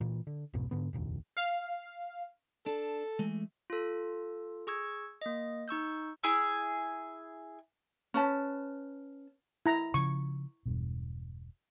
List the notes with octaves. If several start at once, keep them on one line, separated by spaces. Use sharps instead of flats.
A#2 E3
D3
B1 F2 G#2 B2
G#2 D3 B3
F1 A#1 D#2
F5
D4 A4
E3 G#3 A3
F4 A4
G#4 C#6 E6 G#6
A#3 D#5
D#4 C#6 E6 G6
E4 G#4
C#4 B4 A5
E4 A#5
C#3 F3 C#6
E1 G2 B2